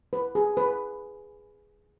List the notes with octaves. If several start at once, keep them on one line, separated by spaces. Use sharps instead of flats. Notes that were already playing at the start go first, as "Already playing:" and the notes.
B4
G#4
B4